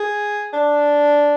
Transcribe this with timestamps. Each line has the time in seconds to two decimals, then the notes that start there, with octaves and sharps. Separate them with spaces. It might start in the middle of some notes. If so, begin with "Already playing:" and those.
Already playing: G#4
0.53 D4